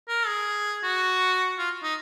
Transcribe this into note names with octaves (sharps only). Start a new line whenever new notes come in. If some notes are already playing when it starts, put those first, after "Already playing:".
A#4
G#4
F#4
F4
D#4